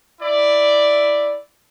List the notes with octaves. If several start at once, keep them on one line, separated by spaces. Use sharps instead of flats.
E4 D5